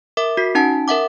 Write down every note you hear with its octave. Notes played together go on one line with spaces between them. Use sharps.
A#4 E5 D6
F#4 B6 C7
C#4 D#4 F#5 A5
A#4 E5 F#5 D6